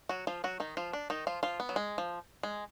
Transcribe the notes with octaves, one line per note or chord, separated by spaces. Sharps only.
F#3 F#4
F3 F4
F#3 F#4
D#3 D#4
F3 F4
D4
D#3 D#4
F3 F4
F3 F4
B3
F#3
G#3
F3
G#3